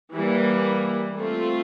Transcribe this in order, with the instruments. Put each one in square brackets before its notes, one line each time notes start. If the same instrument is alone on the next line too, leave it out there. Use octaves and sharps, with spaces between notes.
[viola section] E3 G3 A#3
A3 C4 F4